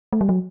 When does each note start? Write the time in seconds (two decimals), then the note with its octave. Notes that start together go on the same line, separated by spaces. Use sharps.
0.13 A3
0.21 G3
0.29 F#3